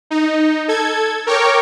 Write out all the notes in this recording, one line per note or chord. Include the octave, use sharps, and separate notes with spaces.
D#4
A4 G#6
A#4 C#5 G5 C#6 D6